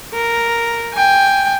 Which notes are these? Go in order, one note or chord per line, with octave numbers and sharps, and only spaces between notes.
A#4
G5 G#5